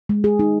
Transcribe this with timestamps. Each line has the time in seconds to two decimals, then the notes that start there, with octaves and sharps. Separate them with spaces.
0.09 G#3
0.24 G#4
0.39 D#4